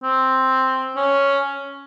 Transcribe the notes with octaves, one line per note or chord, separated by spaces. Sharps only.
C4
C#4